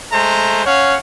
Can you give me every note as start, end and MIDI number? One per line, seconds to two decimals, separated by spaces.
0.13 0.63 56
0.13 0.63 57
0.13 0.63 72
0.13 0.63 82
0.66 0.98 61
0.66 0.98 73
0.66 0.98 77
0.66 0.98 78